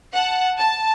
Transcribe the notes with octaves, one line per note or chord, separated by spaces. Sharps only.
F#5 A5
A5